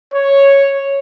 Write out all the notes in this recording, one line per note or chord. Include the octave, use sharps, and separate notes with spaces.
C#5